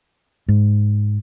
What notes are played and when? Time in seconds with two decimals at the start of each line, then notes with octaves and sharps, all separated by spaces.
0.48 G#2